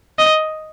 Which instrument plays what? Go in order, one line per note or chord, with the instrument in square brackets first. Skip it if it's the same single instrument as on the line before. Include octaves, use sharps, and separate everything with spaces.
[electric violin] D#5